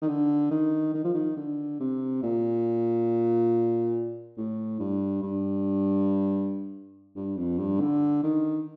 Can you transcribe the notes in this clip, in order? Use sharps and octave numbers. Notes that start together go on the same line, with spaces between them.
D#3
D3
D#3
D#3
F3
D#3
D3
C3
A#2
A2
G2
G2
G2
F2
G2
D3
D#3